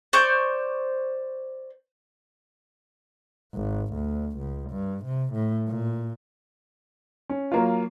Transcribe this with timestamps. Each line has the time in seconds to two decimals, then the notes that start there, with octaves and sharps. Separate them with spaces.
0.13 C5 D5 C#6 G6
3.54 G#1
3.94 D2
4.38 C#2
4.70 G2
5.05 C3
5.33 A2
5.68 A#2
7.30 C#4
7.52 F#3 A#3 F4